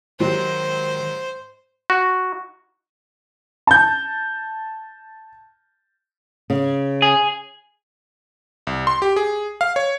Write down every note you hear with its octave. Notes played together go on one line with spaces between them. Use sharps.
G#2 D#3 F#3 G4 C5
F#4
A5 G6
C#3
G#4
C2
C6
G4
G#4
F5
C#5